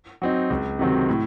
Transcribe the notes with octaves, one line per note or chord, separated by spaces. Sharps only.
F#3 C4 D#4
C#2
C3 D#3 F#3 C4
A2